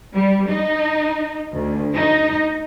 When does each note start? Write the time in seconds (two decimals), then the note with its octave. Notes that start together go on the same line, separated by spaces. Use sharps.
0.15 G3
0.50 D#4
1.53 D2
1.95 D#4